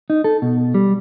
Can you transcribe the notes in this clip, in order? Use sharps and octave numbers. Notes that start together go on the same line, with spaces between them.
D#4
A4
B2
G3